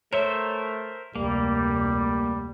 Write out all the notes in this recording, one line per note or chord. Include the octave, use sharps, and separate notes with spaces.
A3 A#4 C5 C#5 E5
F1 D2 G3 A#3